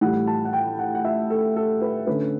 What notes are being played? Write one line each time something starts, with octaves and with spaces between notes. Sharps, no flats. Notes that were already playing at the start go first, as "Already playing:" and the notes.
A2 E3 G3 F#5
A5
F#5
G5
F#5
F#5
E5
A4
A4
B4
D3 A3 C#4 B4